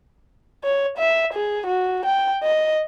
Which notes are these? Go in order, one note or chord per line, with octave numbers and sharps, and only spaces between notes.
C#5
E5
G#4
F#4
G5
D#5